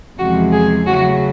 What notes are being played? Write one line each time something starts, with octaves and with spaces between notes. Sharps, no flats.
E2 C3 F3 G#3 F#4
G#4
C#3 F#3 A3 F#4